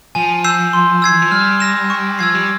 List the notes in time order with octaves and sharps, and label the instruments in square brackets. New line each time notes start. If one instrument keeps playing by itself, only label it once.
[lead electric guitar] F3 [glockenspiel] G#5
[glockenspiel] E6 G6 C7 E7
C6
E6 G#6 C7
[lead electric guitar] E3
F3
[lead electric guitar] G3 [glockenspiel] F6
[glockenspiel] A#6 E7
C#6
[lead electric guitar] F3 [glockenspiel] E6 G#6 C7
[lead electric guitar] G3